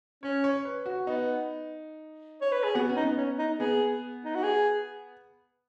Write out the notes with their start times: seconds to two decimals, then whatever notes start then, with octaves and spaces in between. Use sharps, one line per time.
0.23 C#4 C#5
0.44 C#5
0.65 B4
0.86 F#4
1.07 B3 D#4
2.42 C#5
2.52 B4
2.64 G#4
2.75 B3 F#4
2.89 C#4
2.96 D#4
3.04 B3
3.17 C#4
3.39 D#4
3.60 B3 G#4
4.25 D#4
4.35 F#4
4.43 G#4